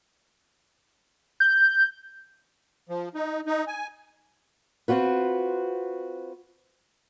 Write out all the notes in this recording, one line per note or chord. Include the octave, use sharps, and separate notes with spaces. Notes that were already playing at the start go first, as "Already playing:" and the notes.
G6
F3
D#4
D#4
G#5
C4 F4 F#4 B4